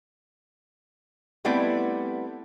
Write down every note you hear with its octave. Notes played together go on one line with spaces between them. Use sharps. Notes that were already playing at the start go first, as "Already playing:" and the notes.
G3 A3 B3 C4 E4 D5